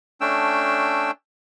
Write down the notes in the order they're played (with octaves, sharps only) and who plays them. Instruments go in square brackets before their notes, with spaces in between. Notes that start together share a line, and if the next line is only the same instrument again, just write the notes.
[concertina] A3 C#4 D4 G5 E6